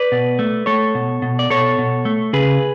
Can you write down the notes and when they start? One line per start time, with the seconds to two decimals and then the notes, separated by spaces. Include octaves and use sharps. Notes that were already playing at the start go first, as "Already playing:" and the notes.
Already playing: B4 D5
0.12 B2
0.39 A3
0.66 A3 A4 C#5
0.95 B2
1.22 B2
1.39 D5
1.50 B2 A4 C#5
1.78 B2
2.05 A3
2.33 C#3 G#4 B4